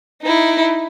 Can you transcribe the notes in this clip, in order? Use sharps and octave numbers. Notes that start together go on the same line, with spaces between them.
D#4 E4